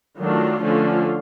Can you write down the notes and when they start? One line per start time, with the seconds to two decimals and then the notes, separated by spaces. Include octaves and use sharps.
0.20 D#3 F#3 A3 D4 F4
0.63 D3 F3 A3 C#4